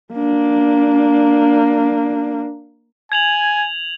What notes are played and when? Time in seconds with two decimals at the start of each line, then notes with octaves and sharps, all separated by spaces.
0.14 A#3 D4
3.12 G#5 G#6 F7 F#7